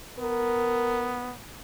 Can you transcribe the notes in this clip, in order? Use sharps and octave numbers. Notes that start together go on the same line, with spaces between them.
B3 A#4